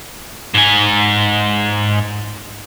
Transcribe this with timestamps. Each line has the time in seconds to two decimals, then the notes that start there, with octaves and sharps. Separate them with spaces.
0.54 G#2 G#5